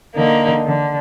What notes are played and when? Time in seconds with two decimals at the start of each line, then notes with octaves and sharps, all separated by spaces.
0.16 D3 A#3 D#4
0.66 D3